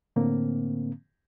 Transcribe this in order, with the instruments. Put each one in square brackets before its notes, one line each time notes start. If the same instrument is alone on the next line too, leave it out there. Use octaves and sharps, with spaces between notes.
[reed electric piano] A2 D3 A#3 C4